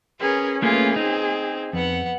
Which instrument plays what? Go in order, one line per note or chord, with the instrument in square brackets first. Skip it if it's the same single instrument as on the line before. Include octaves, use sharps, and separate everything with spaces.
[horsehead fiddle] C#4 G#4 [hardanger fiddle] A#4 B4
[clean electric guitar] A3 A#3 C#4 [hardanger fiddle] F4 B4 [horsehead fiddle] G#4
[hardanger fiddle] C4 [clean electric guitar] D#4
[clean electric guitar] F2 [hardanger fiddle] B3 F#5